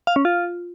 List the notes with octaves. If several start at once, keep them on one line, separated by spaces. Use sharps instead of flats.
F5
C#4
F4